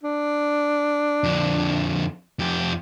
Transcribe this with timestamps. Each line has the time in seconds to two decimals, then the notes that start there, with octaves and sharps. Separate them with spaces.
0.03 D4
1.24 F2 D3
2.39 F2 G4